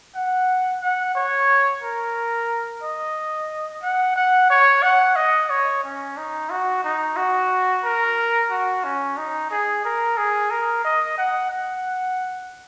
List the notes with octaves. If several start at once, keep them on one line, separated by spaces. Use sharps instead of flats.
F#5
F#5
C#5
A#4
D#5
F#5
F#5
C#5
F#5
D#5
C#5
C#4
D#4
F#4
D#4
F#4
A#4
F#4
C#4
D#4
G#4
A#4
G#4
A#4
D#5
F#5
F#5